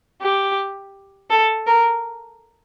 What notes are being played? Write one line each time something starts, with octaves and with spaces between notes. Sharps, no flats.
G4
A4
A#4